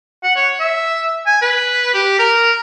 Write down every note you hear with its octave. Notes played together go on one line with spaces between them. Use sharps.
F#5
C#5
E5
G#5
B4
G4
A#4